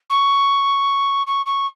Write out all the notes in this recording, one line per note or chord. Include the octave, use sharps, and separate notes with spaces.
C#6
C#6
C#6